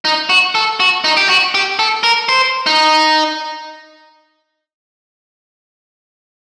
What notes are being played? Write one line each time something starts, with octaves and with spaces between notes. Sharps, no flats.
D#4
F#4
A4
F#4
D#4
G4
F#4
G4
A4
A#4
C5
D#4